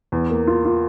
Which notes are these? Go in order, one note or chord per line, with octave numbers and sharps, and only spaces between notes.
E2
A#3
F4
F4